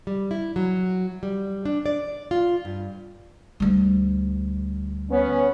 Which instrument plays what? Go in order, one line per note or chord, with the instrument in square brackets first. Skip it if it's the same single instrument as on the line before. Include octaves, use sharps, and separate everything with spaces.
[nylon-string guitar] G3
E4
F#3
G3
D4
D5
F4
G2
[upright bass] D2 G3
[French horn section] B3 C#4